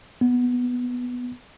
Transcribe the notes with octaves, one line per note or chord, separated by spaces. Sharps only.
B3